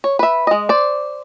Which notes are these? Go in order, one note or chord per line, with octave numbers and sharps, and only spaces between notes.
C#5
B4 E5
G#3 D#5
C5 D5